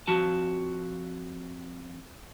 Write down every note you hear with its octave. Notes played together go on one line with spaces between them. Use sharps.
F2 F3 F#4 A5